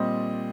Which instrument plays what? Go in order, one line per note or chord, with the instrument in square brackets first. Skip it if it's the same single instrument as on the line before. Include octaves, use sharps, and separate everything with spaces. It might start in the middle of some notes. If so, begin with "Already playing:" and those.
Already playing: [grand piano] A#2 G3 C4 D#5